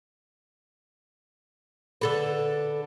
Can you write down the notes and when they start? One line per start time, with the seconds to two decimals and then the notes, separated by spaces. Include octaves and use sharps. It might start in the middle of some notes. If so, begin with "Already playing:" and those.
2.01 D3 A4 B4